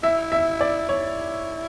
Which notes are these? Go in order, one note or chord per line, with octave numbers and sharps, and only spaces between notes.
E4 E5
E5
D5
E4 C#5